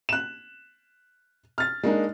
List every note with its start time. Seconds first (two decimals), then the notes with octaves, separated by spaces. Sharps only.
0.09 F#6 E7
1.58 F6 A6
1.83 G#3 A#3 D4 D#4